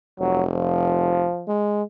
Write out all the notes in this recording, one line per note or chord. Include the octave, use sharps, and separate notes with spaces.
F1 F#3
F3
G#3